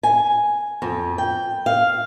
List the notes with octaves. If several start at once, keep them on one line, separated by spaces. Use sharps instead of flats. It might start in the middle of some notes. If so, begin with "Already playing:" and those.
G#5
F2
G5
F5